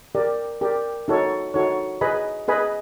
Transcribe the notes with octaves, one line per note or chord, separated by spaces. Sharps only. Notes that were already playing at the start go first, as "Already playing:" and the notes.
G4 A#4 D5
G4 A#4 D5
D#4 F#4 A4 C#5
D#4 F#4 A4 C#5
G#4 B4 D#5 G#5 B5
G#4 B4 D#5 G#5 B5